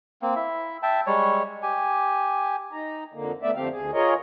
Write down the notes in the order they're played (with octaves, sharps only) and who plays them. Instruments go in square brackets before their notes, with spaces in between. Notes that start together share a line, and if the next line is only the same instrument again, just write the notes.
[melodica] A#3 C4
E4 E5
E5 G5 A5
G3 G#3 C#5
G4 G#5
[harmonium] D#4 A#5
F2 D3 A#3
A3 B3 D5 E5
F2 D3 A3 C4 G4 F5
D2 G#4
F4 G#4 A#4 C#5 D#5